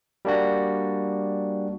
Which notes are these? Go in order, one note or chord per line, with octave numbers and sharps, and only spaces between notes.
G3 A#3 D4 F#4